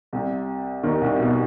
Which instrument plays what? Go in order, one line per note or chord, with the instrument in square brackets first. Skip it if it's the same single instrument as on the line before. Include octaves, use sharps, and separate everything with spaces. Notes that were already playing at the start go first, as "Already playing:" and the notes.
[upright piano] C2 C3
D#2 D#3
C2 C3
B2